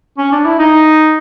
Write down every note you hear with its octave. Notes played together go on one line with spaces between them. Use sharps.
C#4
D4
E4
D#4